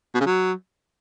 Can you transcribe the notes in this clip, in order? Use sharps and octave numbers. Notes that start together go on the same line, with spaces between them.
B2
C#3
F#3